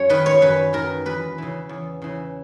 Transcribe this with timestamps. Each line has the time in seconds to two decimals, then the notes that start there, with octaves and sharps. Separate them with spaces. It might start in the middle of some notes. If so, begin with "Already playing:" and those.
Already playing: F#2 C#5
0.09 D#3 B4
0.26 C#5
0.41 F#2 B4
0.73 D#3 A#4
1.05 E2 B4
1.38 C#3 E3
1.69 E2
2.02 C#3 E3